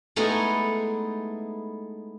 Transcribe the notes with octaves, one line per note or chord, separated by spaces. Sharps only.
G#3 A3 B3 D#4 E4